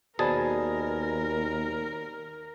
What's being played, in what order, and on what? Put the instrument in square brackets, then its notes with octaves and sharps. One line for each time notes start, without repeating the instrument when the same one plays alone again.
[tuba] D#2 [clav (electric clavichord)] B2 G#4 A5 [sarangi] A#4 [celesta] C5 D5 B5